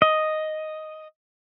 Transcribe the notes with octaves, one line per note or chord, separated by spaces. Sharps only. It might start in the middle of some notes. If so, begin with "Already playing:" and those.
D#5